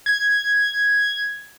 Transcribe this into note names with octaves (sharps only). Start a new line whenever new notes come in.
G#6